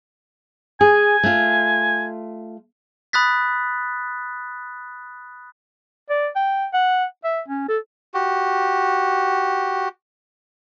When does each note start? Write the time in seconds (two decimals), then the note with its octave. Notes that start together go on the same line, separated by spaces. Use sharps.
0.81 G#4 G#5
1.23 A3 F4
3.13 B5 D#6 F#6 A6 B6
6.10 D5
6.36 G5
6.73 F#5
7.24 E5
7.48 C#4
7.69 A4
8.14 F#4 G4